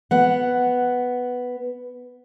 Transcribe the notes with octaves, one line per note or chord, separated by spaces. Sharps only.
B3 F#5